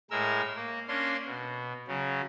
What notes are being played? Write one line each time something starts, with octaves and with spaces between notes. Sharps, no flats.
A2 G#3 A#4 E6
A#3
A#3 C#4 D4 C6
B2
C#3 F#3